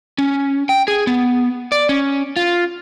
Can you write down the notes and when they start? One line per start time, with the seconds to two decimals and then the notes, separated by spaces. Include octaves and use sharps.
0.18 C#4
0.69 G5
0.88 G#4
1.07 B3
1.72 D5
1.89 C#4
2.36 F4